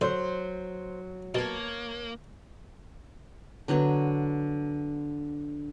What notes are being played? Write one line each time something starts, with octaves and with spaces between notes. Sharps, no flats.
D3 F#3 C5
B2 A#3 C#5 A5
D3 F#3 B3 F#4